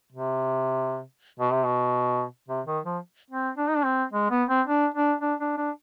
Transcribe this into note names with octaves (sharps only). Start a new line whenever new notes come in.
C3
B2
C3
B2
C3
D#3
F3
C4
D4
D#4
D4
C4
G#3
B3
C4
D4
D4
D4
D4
D4